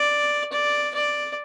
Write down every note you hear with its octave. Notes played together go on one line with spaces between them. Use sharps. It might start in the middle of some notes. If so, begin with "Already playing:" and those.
Already playing: D5
D5
D5